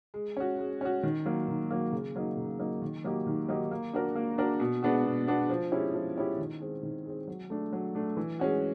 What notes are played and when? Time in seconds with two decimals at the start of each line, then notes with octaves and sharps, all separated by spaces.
0.14 G#3
0.37 C#4 F#4
0.59 G#3
0.81 C#4 F#4
1.03 D#3
1.26 F#3 A#3
1.48 D#3
1.71 F#3 A#3
1.92 C#3
2.15 F#3 A#3 D#4
2.37 C#3
2.59 F#3 A#3 D#4
2.82 D#3
3.04 F#3 A#3 D#4 G4
3.27 D#3
3.48 F#3 A#3 D#4 G4
3.71 A#3
3.93 D4 F#4 A#4
4.16 A#3
4.38 D4 F#4 A#4
4.60 B2
4.83 G#3 B3 D4 F#4
5.05 B2
5.27 G#3 B3 D4 F#4
5.49 F3
5.72 G#3 C#4 E4 G4
5.94 F3
6.17 G#3 C#4 E4 G4
6.38 D#3
6.61 G#3 C4
6.83 D#3
7.06 G#3 C4
7.28 F#3
7.50 A3 D4
7.73 F#3
7.95 A3 D4
8.17 E3
8.39 G#3 C#4 F#4